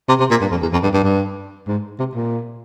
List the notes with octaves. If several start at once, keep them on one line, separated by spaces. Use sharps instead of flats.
C3
C3
A#2
G2
F2
E2
F2
G2
G2
G2
G#2
C3
A#2